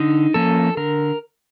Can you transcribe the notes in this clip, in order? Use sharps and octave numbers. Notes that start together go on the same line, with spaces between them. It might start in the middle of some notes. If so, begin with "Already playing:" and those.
Already playing: D3 D#4
F3 A#3 C#4 A4
D3 A#4